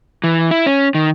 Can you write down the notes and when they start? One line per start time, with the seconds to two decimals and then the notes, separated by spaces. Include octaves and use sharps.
0.24 E3
0.51 E4
0.66 C#4
0.94 D#3